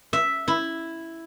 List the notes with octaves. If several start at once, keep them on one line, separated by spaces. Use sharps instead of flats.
E5
E4